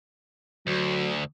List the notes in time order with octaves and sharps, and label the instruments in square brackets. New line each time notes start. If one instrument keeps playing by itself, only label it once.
[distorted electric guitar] D2 [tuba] F#3